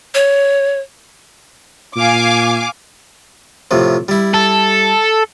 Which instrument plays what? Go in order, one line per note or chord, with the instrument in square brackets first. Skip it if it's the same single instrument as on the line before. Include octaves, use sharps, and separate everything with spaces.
[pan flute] C#5
[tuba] A#2 [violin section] F5 G#5 D6
[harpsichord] A2 C3 F3
G3 E4
[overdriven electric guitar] A4